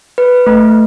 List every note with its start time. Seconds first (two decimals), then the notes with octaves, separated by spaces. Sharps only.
0.18 B4
0.47 A3